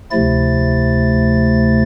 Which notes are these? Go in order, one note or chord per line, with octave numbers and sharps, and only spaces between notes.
D2 C3 F3 A3 E4 A6